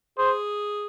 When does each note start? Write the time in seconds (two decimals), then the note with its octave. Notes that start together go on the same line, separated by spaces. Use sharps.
0.18 G#4 C5